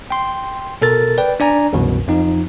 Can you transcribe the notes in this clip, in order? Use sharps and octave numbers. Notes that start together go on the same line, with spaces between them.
G5 C6
B2 A4 A#4 A6
B4 D5 G5
D4 D5 G#5 A#5
C2 F#2 B2 E3
F2 F3 D#4